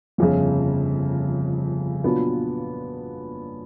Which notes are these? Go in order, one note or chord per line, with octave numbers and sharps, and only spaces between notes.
G1 F2 C#3
A#2 F#3 B3 D4 F4